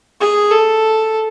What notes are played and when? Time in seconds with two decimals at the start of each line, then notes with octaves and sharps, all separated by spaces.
0.21 G#4
0.51 A4